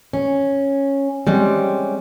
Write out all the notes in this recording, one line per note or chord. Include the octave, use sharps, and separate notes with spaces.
C#4
G3 G#3 C4 C#4